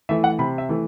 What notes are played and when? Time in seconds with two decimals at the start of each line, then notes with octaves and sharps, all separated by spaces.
0.09 E3 A3 E5
0.24 F#5
0.39 C3 B5
0.58 E5
0.69 E3 A3